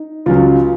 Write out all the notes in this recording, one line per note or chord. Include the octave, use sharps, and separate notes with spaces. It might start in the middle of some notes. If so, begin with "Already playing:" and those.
Already playing: D#4
C#2 C#3 F#3 F4